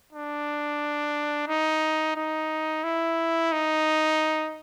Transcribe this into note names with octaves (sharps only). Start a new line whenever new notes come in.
D4
D#4
D#4
E4
D#4